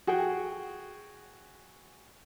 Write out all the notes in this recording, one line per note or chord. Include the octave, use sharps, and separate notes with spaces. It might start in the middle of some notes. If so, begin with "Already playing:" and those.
F#4 G#4 F#5 G5